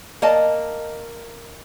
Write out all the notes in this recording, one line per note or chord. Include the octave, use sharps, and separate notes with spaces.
A#3 D#5 A5